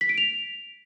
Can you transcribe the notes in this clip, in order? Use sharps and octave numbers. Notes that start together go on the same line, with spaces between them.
B6
D7
F7